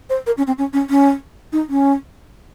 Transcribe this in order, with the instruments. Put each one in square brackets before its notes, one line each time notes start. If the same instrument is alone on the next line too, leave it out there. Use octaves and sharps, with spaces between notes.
[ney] C5
A#4
C#4
C4
C#4
C#4
C#4
D#4
C#4